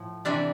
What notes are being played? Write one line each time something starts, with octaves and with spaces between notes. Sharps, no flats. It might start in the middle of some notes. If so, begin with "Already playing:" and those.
Already playing: A2 F3
C3 E3 G3 D4